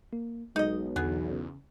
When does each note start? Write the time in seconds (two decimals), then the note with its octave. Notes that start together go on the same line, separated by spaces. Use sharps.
0.13 A#3
0.56 B1 G#3 D#4 D#5
0.96 E2 D3 B3 G#4
1.32 C#3